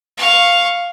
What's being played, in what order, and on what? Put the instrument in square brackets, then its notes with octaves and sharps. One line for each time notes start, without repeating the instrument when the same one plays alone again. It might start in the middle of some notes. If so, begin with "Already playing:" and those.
[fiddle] F5 C#6